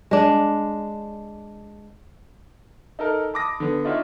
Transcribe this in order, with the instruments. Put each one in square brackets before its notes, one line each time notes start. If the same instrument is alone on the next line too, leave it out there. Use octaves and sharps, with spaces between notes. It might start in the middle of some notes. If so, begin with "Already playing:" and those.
[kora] G#3 D4
[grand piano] D#4 A4 A#4
A5 B5 D6 D#6 A#6
D3 B3
D4 D#4 F4 F#4 C#5 E5